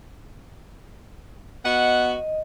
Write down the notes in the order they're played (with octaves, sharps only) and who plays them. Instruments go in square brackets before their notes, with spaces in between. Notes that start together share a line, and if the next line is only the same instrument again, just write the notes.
[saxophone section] B3 F#4 F#5 [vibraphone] D#5